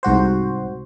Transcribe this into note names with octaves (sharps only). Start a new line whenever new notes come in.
C2 G#2 F#4 C5